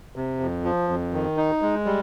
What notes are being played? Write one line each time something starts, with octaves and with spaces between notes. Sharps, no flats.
C3
F2
F3
F2
D#3
D#4
G#3
G3